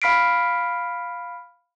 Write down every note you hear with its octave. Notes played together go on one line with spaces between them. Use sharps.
F5 B5 F6 B6 C7 D7